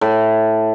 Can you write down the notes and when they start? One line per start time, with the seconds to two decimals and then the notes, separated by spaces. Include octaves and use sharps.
0.01 A2